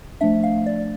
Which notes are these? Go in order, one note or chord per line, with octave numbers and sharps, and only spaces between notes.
F3 A3 D4 E5
F5
D5